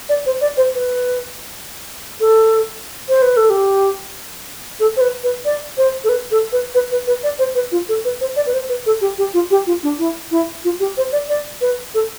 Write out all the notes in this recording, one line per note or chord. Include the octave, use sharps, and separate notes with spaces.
D5
C5
D5
C5
B4
A4
C5
B4
A4
G4
A4
C5
B4
B4
D5
C5
A4
B4
A4
B4
B4
B4
B4
D5
C5
B4
F4
A4
B4
C5
D5
B4
C5
B4
A4
G4
G4
F4
G4
F4
D4
E4
E4
F4
G4
C5
D5
D5
B4
A4